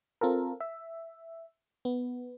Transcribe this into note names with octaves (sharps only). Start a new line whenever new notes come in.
C4 F4 A4 A#4
E5
B3